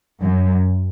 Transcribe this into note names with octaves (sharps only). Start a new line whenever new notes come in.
F#2